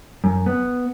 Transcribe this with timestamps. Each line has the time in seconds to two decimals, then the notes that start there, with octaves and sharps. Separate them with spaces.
0.24 F#2
0.46 B3